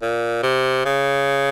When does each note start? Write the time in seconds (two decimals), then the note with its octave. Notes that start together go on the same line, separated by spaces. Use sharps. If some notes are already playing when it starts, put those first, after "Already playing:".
0.02 A#2
0.43 C3
0.85 C#3